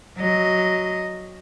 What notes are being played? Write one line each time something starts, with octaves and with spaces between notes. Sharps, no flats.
F#3 D#5